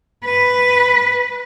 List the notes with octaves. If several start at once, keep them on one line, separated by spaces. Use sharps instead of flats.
B4